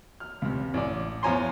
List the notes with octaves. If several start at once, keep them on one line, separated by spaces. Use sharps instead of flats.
F6
C#2 C3
A1 D5
E2 F3 C#5 G#5 A#5 C6